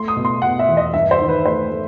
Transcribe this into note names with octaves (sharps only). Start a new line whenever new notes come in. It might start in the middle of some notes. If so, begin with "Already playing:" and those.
Already playing: A3 C6
D#6
B2
C6
B2 F#5
E5
E2
D#5
G2 E5
C5
D#3
B4
A3 C5
A3